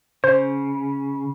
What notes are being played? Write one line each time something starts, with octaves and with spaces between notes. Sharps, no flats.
C#3 C5